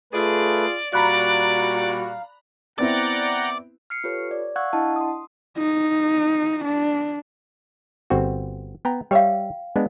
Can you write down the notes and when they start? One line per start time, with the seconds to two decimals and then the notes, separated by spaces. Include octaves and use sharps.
0.13 A3 F4 G#4 B4 D5
0.93 A#2 G3 F#4 D5 F5 A#5 B5 F#6
2.78 B3 C4 E4 D5 F#5 G5 A#5
3.90 F6 C7 C#7
4.04 F4 G4 A4 B4 C#5
4.31 D5
4.56 F5 F#5 C#6 E6 F#6 G#6
4.73 D4 E4 D#5 F#5 A5
4.96 C6 D#6
5.58 D#4
6.65 D4
8.10 G1 C4 F#4
8.85 B3 G5 A#5
9.11 G3 C#5 E5 F5 G5
9.76 G#3 B3 D4